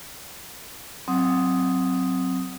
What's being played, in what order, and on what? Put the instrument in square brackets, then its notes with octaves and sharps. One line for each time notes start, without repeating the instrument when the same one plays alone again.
[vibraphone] F#3 C4 F#5 D#6